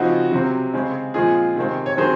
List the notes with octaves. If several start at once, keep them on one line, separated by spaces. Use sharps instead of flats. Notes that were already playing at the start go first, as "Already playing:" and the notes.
Already playing: C#3 F3 C4 D#4 F#4
C3 F#3 C4
C#3 G#3 C4
A#2 F3 G#3 C4 F4 G#4
C3 D#3 G#3 C4
C#5
D#3 F#3 C4 G#4 C5